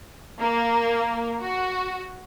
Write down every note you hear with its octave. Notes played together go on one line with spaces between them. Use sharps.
A#3
F#4